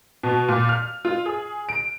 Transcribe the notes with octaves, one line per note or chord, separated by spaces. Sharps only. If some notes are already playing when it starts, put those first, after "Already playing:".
B2
A#2
F6
F4
G#4
D7